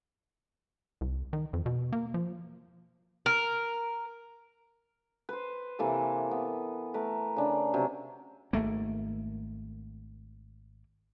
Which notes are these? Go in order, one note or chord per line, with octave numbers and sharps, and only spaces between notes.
C2
D#3
F2
B2
A#3
F3
A#4
B4 C5
C3 E3 A#3 A4
B3
A3 A#4 B4
C#3 D4
C3 F#3 C#4
G#1 A3 A#3